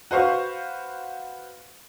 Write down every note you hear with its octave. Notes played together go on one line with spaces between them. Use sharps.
F#4 B4 C5 F5 C#6